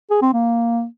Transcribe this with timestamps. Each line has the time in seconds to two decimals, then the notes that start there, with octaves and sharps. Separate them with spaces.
0.10 G#4
0.22 C4
0.33 A#3